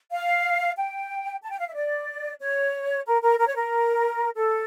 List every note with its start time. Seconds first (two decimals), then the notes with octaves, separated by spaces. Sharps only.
0.12 F5
0.77 G5
1.42 A5
1.50 G5
1.59 F5
1.67 E5
1.75 D5
2.40 C#5
3.06 A#4
3.22 A#4
3.39 A#4
3.47 C#5
3.55 A#4
4.36 A4